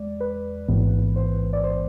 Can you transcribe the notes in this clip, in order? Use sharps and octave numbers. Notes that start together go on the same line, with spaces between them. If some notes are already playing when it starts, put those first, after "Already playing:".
Already playing: E2 G#3 D5
B4
A1 G#2 E3 B3
C5
D5
C5